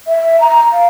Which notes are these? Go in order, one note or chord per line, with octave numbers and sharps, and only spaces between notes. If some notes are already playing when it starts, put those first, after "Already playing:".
E5
A#5
F5